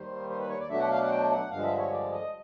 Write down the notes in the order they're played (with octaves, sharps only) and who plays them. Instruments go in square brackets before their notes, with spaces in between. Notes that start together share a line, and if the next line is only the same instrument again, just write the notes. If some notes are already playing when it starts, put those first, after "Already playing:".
Already playing: [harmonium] D#2 D#3 G3 C5
C5
B4
C#5
D5
B2 F#3 A3 D4 E5
F#5
F5
F#5
G5
F#5
G2 D3 F3 G#3 F5
E5
C#5
D5
D#5